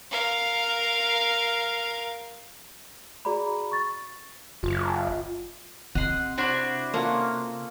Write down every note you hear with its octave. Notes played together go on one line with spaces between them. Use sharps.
A#4 F5
F#4 G#4 D5 A#5 B5
C#6 A6
F#1 F4
C3 D#5 F#5 C6
D4 E4 F#4 C5
A#3 C#4 F4 A4